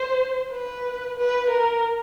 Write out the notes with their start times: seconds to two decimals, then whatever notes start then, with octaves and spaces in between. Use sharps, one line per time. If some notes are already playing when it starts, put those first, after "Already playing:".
Already playing: C5
0.51 B4
1.17 B4
1.50 A#4